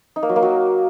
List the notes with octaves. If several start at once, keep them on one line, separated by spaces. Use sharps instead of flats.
D#4
A#3
F#3
A#3
F#3